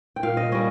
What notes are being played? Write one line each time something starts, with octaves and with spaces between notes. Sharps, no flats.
G5
A#2 F5
D#5
G3 C#4 D#5